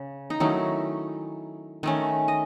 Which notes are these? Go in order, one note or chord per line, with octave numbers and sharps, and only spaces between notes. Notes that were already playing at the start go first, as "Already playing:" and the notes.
Already playing: C#3
D#4
D#3 F#3 A3 C#4 E4
D#3 A3 C#4
D#5